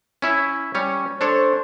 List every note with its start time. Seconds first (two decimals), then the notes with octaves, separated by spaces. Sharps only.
0.22 C#4 E4 E5
0.75 G3 C#4 C#5
1.21 D4 A4 C5 C#5